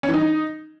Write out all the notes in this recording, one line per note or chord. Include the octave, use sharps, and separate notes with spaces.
C#4
E3
D#4